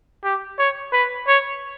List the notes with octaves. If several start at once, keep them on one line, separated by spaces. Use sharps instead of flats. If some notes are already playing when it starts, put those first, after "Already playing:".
G4
C#5
B4
C#5